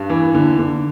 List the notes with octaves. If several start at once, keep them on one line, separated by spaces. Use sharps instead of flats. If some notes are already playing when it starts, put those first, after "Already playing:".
Already playing: G2
E3
D3
D3